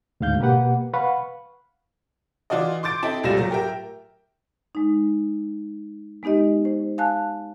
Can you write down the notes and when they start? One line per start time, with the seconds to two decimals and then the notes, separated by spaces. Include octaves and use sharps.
0.20 D2 G#2 F5 G6
0.40 B2 A#3 G4 B4 F#5
0.93 B4 F5 F#5 B5 C#6
2.50 E3 F4 F#4 D5 D#5
2.83 C6 D6 G6 A6 D7
3.03 C4 E4 A4 D#5 E5
3.23 F1 C#2 A#2 G3 A#6 E7
3.37 A#2 F#3 A3
3.51 G4 A#4 E5 G5
4.75 G#3 D#4
6.23 G#3 B3 D#4 G4 D#5
6.65 C5
6.98 F5 G#5 A5 F#6